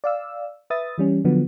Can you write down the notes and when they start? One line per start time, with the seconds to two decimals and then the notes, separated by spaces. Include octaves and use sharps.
0.04 D5 F5 E6
0.70 B4 E5 D#6 A6
0.98 E3 G3 C#4
1.25 D3 F3 F#3 B3